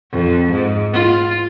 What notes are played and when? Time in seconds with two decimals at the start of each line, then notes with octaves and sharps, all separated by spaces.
0.12 F2
0.52 G#2
0.93 F4